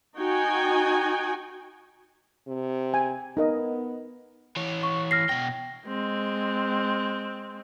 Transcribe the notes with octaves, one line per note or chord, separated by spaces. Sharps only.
D#4 F#4 G5 G#5
C3
G#5
B3 D#4 A#4 D#5
E3 C#5
C#6
F6 A#6 C7
B2 G5 A#6
G#3 C4